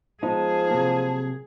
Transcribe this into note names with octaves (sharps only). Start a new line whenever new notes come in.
F3 G#3 B3 D#4 G#4 A5
C3 F#3 A#3